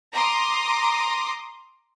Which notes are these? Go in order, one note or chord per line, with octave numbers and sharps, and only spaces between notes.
A#5 C6 D6 D#6